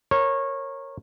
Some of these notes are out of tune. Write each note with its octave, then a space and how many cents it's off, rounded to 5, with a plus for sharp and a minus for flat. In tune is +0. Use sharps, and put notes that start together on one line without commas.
A#4 +0 C#5 -20